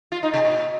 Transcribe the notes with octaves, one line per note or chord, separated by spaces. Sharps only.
F4
D#4
C3
A#2